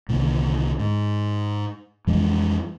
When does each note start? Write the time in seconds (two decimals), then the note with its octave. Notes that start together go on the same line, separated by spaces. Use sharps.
0.09 C2 D3 D#3 A#3
0.79 G#2
2.07 F2 E3 G3 G#3